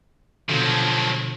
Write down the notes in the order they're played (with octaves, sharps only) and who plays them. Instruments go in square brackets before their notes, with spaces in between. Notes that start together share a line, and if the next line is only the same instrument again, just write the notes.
[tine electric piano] B2 D3 [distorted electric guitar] F3 F#3